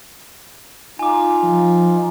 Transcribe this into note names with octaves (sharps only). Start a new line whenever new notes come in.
D#4 F4 G#5 D6
F3